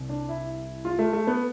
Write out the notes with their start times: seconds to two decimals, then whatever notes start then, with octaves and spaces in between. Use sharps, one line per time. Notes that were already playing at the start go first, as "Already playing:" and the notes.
Already playing: C2 C3
0.09 D4
0.29 E4
0.85 F4
0.99 A3
1.13 A3
1.27 B3